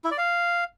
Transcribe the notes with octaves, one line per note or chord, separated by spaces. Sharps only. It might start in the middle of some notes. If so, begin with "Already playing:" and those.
E4
D5
F5